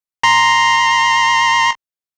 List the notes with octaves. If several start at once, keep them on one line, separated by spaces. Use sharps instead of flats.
A#5 C6